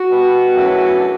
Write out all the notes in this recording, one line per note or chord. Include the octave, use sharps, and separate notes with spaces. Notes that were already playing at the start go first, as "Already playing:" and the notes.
Already playing: F#4
B2 G3 B3
F#2 C#3 E3 A3
D4